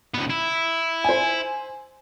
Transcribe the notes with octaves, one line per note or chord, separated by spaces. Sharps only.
C#2 B3
E4
C5 G#5